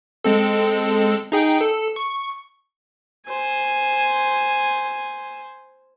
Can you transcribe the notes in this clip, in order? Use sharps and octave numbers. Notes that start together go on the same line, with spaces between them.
G#3 C4 A4
D#4 G#4 G5
A4
C#6
C5 G#5